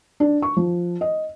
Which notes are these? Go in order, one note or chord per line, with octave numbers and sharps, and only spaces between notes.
D4
C#6
F3
D#5